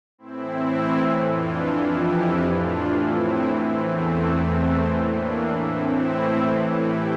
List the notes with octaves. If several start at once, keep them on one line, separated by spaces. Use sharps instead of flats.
A2 E3 C4 E4
F2 E3 D4 F4
E4 G4
A2 E3 D4 F4
C4 E4
E2 E3 A3 C4
A3 C4
A3 C4
A2 E3
A#3 D4
C4 E4
A2 E3
E4 G4